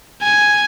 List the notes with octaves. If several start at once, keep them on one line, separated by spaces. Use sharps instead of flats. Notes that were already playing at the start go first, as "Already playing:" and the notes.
G#5